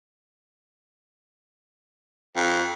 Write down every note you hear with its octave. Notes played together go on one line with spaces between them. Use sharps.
F2